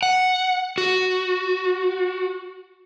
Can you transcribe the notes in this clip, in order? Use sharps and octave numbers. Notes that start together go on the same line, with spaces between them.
F#5
F#4